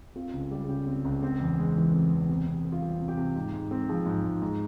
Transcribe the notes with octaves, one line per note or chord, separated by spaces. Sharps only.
C4 F4
C#2
G3
G#4
C#3 G4
C4
C#2
C4
E2
G#3
E3
C4
E2
C3 G4
C3
C4
F4
G3 G4
C3
G4
C3
G#2
G#2
C4
F3 G#4
G#2
G#2
G#2